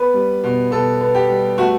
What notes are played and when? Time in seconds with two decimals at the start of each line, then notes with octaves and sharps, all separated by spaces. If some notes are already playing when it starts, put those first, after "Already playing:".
Already playing: B3 B4
0.14 G3
0.44 B2
0.71 B2 A4
1.01 B3
1.15 G4
1.29 G3
1.58 A3 F#4